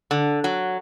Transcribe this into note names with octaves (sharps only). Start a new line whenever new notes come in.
D3
F#3